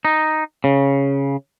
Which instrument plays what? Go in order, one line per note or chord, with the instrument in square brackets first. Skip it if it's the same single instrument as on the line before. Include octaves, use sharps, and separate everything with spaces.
[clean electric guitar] D#4
C#3